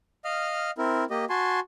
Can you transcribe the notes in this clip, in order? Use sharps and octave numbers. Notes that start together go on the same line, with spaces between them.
D#5 F5 F6
C4 E4 A#4
A#3 G4 D#5
F#4 G#5 A5 C6